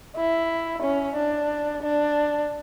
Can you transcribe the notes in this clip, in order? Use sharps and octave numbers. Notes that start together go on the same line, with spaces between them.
E4
C#4
D4
D4